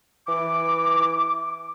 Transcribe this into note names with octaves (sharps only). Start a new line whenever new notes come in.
E3 D6